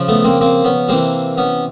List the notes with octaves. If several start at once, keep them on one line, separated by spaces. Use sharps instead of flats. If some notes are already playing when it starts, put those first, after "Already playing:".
Already playing: C#3 F3
A3 B3
A#3 C4
A#3 C4
B3 C#4
C3 E3 A#3 C4
B3 C#4